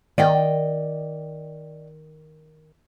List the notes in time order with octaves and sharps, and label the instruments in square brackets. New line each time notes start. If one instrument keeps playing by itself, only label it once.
[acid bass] D#3 [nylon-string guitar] D5 D#5 G5